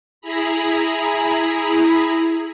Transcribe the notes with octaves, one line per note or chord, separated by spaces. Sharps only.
E4 G#4 A#5 B5